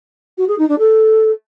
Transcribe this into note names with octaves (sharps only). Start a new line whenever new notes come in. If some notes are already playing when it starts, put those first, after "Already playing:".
F#4
G#4
D#4
D4
A4